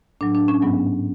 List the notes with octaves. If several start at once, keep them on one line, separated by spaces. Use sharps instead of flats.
A2 F#3 D4
D4
C#4
G#2 F#3 B3